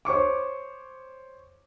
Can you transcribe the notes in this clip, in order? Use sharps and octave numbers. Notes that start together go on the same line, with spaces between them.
C5 C#5 C#6 D6